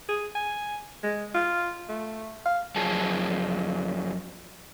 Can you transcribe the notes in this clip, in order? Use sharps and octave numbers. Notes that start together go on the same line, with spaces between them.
G#4
G#5
G#3
F4
A3
F5
F#2 F3 G#4 A5